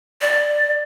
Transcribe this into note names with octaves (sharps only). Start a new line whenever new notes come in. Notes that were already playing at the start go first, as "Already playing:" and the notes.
D5